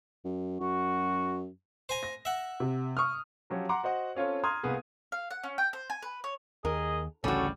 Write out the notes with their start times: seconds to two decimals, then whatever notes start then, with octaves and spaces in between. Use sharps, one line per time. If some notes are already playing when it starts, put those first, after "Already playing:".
0.24 F#2
0.60 F#2 F#4
1.89 C5 G#5 A#5
2.03 A#6
2.25 E5 F#5
2.60 C3
2.97 C#6 D#6 F6
3.50 F3 F#3 C#4 G4
3.69 F#5 A#5 C6 D6
3.83 F#4 C5 D#5 F#5
4.15 C4 C#4 F4 A4 C#5
4.44 A#5 C6 D#6 F6 G#6
4.63 C2 A#3 B3 G#4
5.12 F5
5.31 F#5
5.43 C#4
5.58 G5
5.73 C5
5.90 G#5
6.02 B4
6.24 C#5
6.65 D#2 G#4 A#4 D#5
7.24 A1 D2 C#3 G3 C#4 F#4 A4